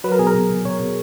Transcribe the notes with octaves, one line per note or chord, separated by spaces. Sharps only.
F#3 B4
A#4
B2 G#4
A#4
B2
B2
B2 C#5
B2